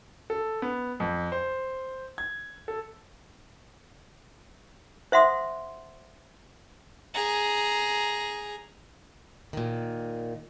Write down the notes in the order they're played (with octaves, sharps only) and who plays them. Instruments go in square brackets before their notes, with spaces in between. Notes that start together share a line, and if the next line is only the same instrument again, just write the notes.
[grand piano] A4
B3
F2
C5
G#6
A4
[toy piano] C5 E5 F#5 C6 D#6
[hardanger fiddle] G#4 A#5
[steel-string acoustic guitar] A#2 D#3